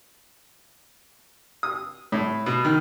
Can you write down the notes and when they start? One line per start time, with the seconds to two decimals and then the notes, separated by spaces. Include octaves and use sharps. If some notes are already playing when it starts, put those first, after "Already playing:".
1.63 D#6
2.12 A2
2.46 B2
2.65 D#3